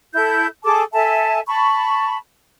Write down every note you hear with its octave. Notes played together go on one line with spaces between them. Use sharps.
E4 A4 G6
G#4 A4 A5 D6
A4 E5 G#5 A5
A5 B5 C#6